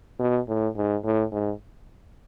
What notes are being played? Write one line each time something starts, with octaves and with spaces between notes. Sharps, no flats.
B2
A2
G#2
A2
G#2